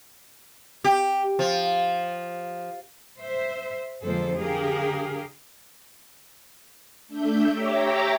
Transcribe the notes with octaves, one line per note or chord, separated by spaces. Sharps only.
G4
F3
C5 E5
F2 D3 G#3 A#3 A4 C5
D3 G4 G#4 A#4 F5
A3 D4 E5 G6
G4 C#5 E5 G5 A#5 D6